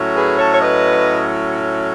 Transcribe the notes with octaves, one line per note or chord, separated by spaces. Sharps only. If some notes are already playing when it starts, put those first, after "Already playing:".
Already playing: A2 F#3 C#4
G#4 B4
A4 C#5
C#5
B4 D#5